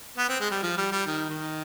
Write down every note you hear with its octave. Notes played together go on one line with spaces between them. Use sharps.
B3
C4
G#3
G3
F3
G3
G3
D#3
D#3